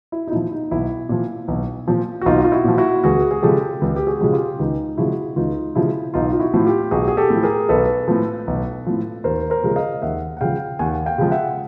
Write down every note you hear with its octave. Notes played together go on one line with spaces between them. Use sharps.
E4
D#4
A#2 F3 E4
D#4
B1 E4
A#2 F3
B1
A#2 F3
F#4
B1 D#4 F4
F4
E4 F#4
A#2 F3
E4 F#4
C#2 F#4 G#4
G#4
C#3 F3 G#3 G4 A4
C#2
G4
F#4 G#4
C#3 F3 G#3
F4 G4
C#2 D#4
C#3 F3 G#3 E4 F#4
C#2 D#4 F4
C#3 F3 G#3 E4
B1 D#4 F4
F4
E4 F#4
A2 F3
F4 G4
B1 F#4 G#4
G#4
G4 A4
A2 F3
G#4 A#4
B1 A4 B4
A2 F3
B1
A2 F3
D#2 A#4 C5
A#4 C5
C#3 F3 G#3
D#5 F5
D#2 E5 F#5
F#5
C#3 F3 G#3 F5 G5
D#2 F#5 G#5
F5 G5
C#3 F3 G#3
E5 F#5